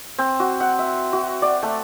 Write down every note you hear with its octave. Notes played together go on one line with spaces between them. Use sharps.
C4
F#4
F#5
E5
F#4
D5
A3